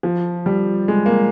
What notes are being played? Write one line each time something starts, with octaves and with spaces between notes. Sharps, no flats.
F3
G3
G#3
A#3